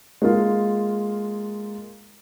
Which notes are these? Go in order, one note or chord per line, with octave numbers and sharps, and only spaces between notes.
G#3 A#3 F4